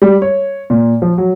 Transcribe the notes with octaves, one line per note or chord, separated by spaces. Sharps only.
G3
C#5
A#2
F3
F#3